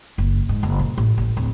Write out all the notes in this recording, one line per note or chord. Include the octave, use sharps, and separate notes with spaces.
F#1
G#2
F#1
A#2
A1
A1
D1